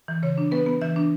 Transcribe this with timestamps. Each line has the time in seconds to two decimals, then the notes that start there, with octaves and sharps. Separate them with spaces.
0.08 E3
0.23 C#3 C#5
0.38 D4
0.51 B3 B4
0.66 B3
0.82 E3 E5
0.96 D4